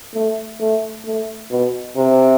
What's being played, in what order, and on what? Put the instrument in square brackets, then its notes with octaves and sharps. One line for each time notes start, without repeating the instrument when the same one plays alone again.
[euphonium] A3
A3
A3
B2
C3